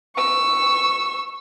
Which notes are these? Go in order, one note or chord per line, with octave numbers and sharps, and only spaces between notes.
C#6 E6